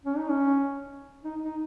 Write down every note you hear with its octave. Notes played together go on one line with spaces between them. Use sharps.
C#4
D#4
C#4
D#4
D#4